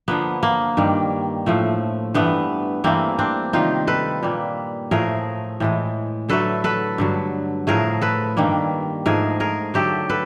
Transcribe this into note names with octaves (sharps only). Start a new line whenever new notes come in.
D3 F3 A#3 B3
A#3
G2 D#3 G3
A2 F3 A3
G2 E3 A3 B3
G2 E3 A3 A#3 C4
C4 D4
C3 D#3 G3 D#4 F4
A4 B4
A#2 G3 A#3
A2 F3 A3 G#4 A#4
A2 E3 G#3
D3 F#3 A3 A4 B4
A4 B4
G2 D3 F#3
A2 F3 A3 G#4 A#4
A4 B4
G2 D#3 G3 A#3
G#2 F3 A3 G#4 A#4
G#4 A#4
D3 F#3 A3 G4 A4
A4 B4